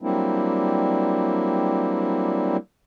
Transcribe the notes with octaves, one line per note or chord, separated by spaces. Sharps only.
F#3 G3 A#3 C4 D4 E4